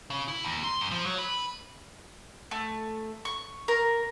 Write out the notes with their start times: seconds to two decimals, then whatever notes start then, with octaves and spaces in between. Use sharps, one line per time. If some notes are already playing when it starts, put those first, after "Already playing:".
0.10 C#3
0.28 E4
0.43 D#2
0.64 C6
0.80 F#2
0.92 F3
1.06 F#3
1.18 B4
2.51 A3
3.25 C#6
3.68 A#4